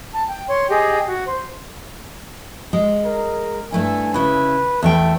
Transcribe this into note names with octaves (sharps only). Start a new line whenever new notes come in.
A5
G5
C#5 C6
G4 G#4 D#5 G5
F#4
C5
G#3
A#4
G2 A3 E4 G#5
C#3 E4 B4
E2 A3 E5 G5